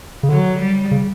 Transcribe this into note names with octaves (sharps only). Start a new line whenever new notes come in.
C#3
D3 F#3
G3
C#3